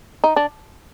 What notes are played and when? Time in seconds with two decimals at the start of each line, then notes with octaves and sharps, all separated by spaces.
0.24 D#4
0.36 D4